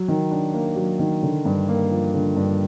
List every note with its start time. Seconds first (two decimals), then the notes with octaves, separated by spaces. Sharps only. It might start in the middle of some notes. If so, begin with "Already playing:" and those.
Already playing: F#3
0.08 D#3
0.31 D4
0.54 A#3
0.76 F#3
0.99 D#3
1.23 D3
1.45 G2
1.68 A#3
1.91 F3
2.14 D3
2.36 G2